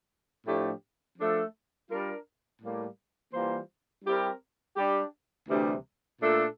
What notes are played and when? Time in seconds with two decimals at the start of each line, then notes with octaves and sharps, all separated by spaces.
0.47 A2 F3 A3 D4 G4
1.19 F3 A3 D4 A4
1.90 G3 D4 F4 A#4
2.62 A2 G3 A#3
3.34 E3 G3 A#3 F4 C5
4.05 G3 C4 E4 G4 A#4
4.77 G3 D4 G4
5.49 D2 C3 E3 G3
6.21 A#2 A3 D4 A4